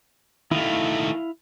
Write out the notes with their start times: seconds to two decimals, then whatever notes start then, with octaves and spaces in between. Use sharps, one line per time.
0.52 D#3 A3 E4 F5